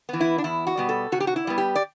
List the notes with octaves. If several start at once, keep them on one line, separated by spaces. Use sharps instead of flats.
E3 B3
E4
D4
E2 E4
F#4
B2 G3 B3
A4
C3 F#4
G4
F#4
E4
G3 B3
G4
D5